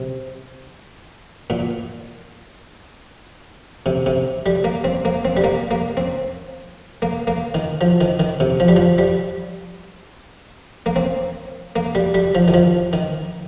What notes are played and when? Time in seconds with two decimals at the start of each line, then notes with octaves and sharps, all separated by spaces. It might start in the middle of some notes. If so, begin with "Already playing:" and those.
Already playing: C3
1.50 A#2
3.86 C3
4.06 C3
4.46 G3
4.64 A#3
4.84 C4
5.05 A#3
5.25 C4
5.37 G3
5.44 A#3
5.71 A#3
5.97 C4
7.02 A#3
7.27 A#3
7.54 D#3
7.81 F3
8.01 D#3
8.19 D#3
8.40 C3
8.60 F3
8.68 G3
8.76 F3
8.98 G3
10.86 A#3
10.96 C4
11.76 A#3
11.95 G3
12.14 G3
12.35 F3
12.48 D#3
12.54 F3
12.93 D#3